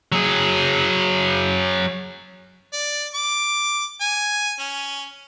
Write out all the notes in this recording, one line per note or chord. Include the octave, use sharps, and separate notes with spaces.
F#3 G#4
D5
D6
G#5
C#4